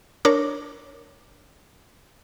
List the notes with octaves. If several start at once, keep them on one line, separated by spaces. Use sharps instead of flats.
D4 A#4 C#5 D6